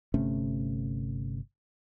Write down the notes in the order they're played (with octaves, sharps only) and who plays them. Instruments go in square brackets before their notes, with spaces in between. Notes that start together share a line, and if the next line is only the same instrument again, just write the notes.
[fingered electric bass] G1 C3 A3 C#4